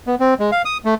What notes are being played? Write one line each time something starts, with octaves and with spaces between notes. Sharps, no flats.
B3
C4
G#3
F5
D#6
A3